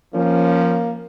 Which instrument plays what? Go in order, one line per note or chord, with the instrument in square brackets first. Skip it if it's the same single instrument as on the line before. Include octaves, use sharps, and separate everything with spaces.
[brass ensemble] F3 C#4 [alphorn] A#3